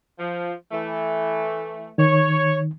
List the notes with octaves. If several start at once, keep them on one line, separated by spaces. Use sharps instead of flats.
F3
E3 A3
D#3 C#5